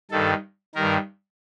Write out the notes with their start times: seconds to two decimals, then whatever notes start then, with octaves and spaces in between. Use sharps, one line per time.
0.11 G2 D#3 A4
0.75 G2 D#3 A#4